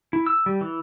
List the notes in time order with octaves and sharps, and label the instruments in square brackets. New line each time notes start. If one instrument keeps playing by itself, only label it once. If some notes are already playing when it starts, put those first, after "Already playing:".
[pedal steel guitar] E4
E6
G3
E3